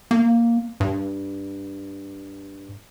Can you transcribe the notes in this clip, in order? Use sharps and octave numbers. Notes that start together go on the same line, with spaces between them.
A#3
G2